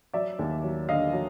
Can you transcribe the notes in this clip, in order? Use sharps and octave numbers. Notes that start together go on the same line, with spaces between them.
F#3 D5 E5
D#2
F#3
D3 D#5 F5
F#3